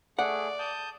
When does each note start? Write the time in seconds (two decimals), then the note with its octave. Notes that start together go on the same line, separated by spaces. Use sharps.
0.19 A3 G#4 D5 F#5
0.59 A5 D#6 G6